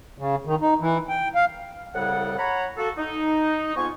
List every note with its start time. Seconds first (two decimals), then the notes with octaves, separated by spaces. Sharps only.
0.18 C#3
0.46 D#3
0.61 D#4
0.81 E3
1.09 G5
1.35 F5
1.94 C2 A2 C#3 G3 F#5
2.38 C#5 F#5 A#5 B5
2.77 A#3 F#4 A4
2.97 D#4
3.75 F2 G#2 B3 F4 G#5 C#6